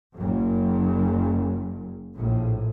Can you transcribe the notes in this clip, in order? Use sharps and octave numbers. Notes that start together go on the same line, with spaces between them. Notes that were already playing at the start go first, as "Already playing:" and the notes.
F#1 F#2
A#1 A2